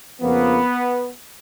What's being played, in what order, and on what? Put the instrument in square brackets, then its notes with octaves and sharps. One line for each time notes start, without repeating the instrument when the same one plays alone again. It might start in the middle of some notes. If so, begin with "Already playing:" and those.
[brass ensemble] F2 C#3 F3 A#3 B3